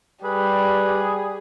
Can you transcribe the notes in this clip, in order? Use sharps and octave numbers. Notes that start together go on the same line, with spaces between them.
G3 G#4 B4